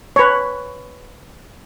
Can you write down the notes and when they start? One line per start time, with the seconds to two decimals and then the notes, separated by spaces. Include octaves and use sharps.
0.16 B4 C#5